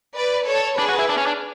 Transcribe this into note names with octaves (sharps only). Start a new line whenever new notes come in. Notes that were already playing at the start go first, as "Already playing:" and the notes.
B4 D5
A4 C#5
D4 G#4 B4
F#4
E4
D4
C#4
D4